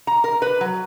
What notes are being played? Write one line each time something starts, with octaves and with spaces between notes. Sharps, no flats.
A#5
A#4
B4
F#3